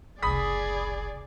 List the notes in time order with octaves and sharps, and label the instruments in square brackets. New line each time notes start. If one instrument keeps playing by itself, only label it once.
[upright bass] F#1 C2 [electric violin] G#4 D5 [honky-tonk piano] B5 D#6 B6